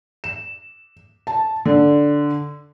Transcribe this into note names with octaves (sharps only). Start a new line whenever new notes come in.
E7
A5
D3